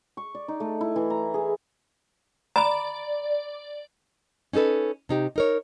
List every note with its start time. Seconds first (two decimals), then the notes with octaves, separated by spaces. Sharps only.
0.17 C#6
0.35 D5
0.48 D#4
0.60 A3
0.81 E4
0.96 E3
1.10 A#5
1.34 G#4
2.56 D5 A#5 B5
4.53 C#4 D#4 G4 A4 B4
5.09 C3 D#4 G4
5.36 D#4 A#4 C#5